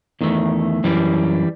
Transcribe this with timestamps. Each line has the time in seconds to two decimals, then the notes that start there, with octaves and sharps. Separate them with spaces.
0.21 E2 D#3 A3
0.84 F#2 E3 G3